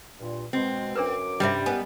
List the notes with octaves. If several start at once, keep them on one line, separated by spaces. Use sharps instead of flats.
G2 A#2
B2 G#3 C4
F#2 D4 A#4 B4 D6
G2 C3 G3 C#4 D5 E5
B3 D#4 A#4 G#5